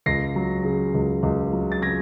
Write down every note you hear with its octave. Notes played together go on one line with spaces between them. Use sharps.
C#2 A#6 C7
F#3
C#3
C#2
C#2
F#3
A6
C#3 G#6 A#6